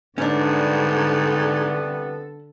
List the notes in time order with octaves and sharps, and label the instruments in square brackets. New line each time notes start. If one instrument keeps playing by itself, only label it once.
[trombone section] C2 G3 B3 [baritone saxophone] G#2 [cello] D3 A4 [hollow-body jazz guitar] C#4 D4